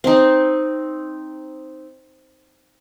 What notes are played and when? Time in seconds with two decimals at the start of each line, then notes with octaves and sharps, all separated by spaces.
0.04 C4 D#4